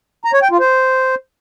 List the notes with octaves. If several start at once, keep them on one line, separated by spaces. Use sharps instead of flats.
A#5
C#5
G5
F4
C5